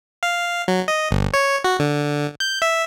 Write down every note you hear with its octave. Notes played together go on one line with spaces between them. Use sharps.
F5
F#3
D#5
G1
C#5
F#4
D3
G6
E5